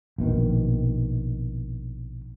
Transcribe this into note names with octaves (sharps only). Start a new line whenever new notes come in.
A#1 B2 D#3